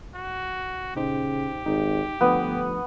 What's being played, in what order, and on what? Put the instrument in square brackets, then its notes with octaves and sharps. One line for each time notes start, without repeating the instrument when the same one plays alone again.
[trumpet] F#4
[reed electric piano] A#2 D#4 C5 [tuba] C#3 [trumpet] G4
[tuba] G#1 [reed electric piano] D#4
[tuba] G1 [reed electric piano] F3 A3 D4 [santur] B3